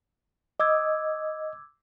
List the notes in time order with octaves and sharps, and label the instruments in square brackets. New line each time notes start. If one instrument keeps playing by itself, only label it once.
[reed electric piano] D#5 [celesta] D6 E6 G#6